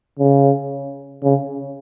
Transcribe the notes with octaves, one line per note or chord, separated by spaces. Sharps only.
C#3
C#3